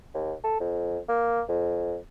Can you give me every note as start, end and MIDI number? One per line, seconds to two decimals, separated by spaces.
0.14 0.34 39
0.44 0.57 69
0.60 0.98 41
1.09 1.42 58
1.49 1.97 41